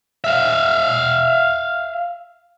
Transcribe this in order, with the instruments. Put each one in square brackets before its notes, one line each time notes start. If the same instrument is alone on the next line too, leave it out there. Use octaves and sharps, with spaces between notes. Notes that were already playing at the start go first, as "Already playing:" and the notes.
[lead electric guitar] E5 F5